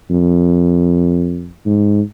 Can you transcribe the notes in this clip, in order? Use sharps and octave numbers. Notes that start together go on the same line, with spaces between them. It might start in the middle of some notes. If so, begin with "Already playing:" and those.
F2
G#2